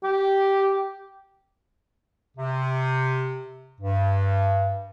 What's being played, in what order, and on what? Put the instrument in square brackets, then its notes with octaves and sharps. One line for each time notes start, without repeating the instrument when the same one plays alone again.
[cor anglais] G4
[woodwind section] C3
G2